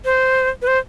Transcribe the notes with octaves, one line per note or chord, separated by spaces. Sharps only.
C5
B4
C5